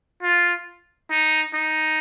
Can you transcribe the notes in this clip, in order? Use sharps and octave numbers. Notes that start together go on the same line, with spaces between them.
F4
D#4
D#4